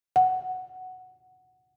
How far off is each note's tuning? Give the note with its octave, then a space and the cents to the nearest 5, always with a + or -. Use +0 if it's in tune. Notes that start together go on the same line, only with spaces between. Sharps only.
F#5 +0